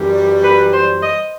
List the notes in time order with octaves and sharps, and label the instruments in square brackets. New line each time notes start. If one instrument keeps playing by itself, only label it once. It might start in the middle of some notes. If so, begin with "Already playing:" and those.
Already playing: [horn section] F#2 E3 G3
[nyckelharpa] B4
C5
D#5